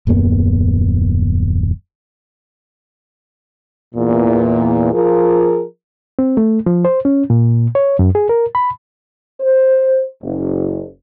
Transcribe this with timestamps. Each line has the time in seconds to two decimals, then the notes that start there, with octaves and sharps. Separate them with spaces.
0.07 D#1 F#2 A#3 B3
3.95 E2 A#2
4.93 F3 F4 G#4 A#4
6.19 C4
6.37 A3
6.66 F3
6.85 C5
7.05 C#4
7.30 A#2
7.75 C#5
7.99 F#2
8.15 G#4
8.29 A#4
8.55 B5
9.40 C5
10.23 F#1